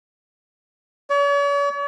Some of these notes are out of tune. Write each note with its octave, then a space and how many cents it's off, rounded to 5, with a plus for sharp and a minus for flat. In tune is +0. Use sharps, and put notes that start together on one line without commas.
C#5 +45